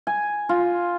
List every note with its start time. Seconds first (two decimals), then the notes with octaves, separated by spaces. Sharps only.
0.07 G#5
0.49 F4